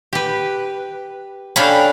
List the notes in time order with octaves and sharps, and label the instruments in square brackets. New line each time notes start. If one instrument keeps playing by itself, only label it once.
[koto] G4 B4
[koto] C#4 D4 A4 [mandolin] F5 G5 B5